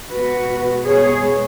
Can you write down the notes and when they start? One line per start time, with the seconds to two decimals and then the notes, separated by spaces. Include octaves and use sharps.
0.10 B2 G#3 B3 F#4 B4
0.85 G#4 C#5